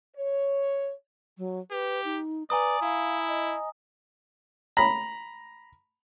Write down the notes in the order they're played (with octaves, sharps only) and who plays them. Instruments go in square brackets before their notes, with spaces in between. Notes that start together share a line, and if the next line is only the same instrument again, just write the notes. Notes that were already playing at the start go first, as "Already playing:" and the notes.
[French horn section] C#5
[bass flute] F#3
[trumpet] G4 [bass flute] B4
[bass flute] D#4
[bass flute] B4 [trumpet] D5 [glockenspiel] G#5 A#5 D#6
[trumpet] E4 [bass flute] F5
[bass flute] D#5
[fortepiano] A#5 B5